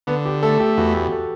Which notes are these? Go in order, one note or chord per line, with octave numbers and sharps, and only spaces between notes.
D3 B3
G4
A3 A4
G4
E2 F#4
G4
A4